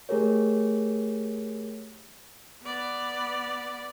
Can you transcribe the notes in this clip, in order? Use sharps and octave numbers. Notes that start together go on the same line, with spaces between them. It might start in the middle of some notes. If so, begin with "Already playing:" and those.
A3 G4 G#4 A#4 C#5
B3 D5